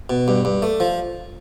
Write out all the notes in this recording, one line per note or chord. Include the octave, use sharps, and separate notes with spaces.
B2
G2
G2
A3
F3